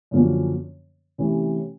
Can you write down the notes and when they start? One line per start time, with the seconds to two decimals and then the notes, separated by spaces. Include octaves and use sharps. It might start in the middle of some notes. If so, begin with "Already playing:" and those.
0.11 F#2 D3 F3 A#3 C#4
1.18 C3 E3 A3 C#4